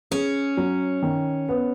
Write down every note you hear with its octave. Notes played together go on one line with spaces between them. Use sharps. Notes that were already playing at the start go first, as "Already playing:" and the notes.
C#4 G#4
F#3
D#3
B3